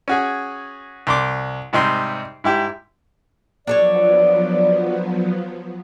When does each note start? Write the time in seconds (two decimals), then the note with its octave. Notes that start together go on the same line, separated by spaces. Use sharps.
0.08 C#4 F#4 G#4
1.07 C2 C6 D6
1.73 G#2 C3 G3 D#4 G5 C6
2.44 G#2 E4 G4 E5
3.67 F3 F#3 B3 D4 A4 C#5 D5